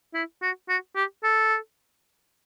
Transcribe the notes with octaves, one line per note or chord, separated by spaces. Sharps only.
E4
F#4
F#4
G4
A4